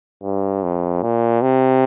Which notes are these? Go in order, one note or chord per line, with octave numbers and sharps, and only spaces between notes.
G2
F2
A#2
C3